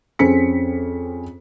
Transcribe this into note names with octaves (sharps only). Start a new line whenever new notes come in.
F2 C4 C#4 G#4 B6 C#7